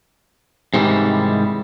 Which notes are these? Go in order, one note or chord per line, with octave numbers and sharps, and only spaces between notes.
G#2 C3 D#3 E3 G3